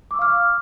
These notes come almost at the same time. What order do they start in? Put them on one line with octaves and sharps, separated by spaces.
D6 E6 C#6 F5 F6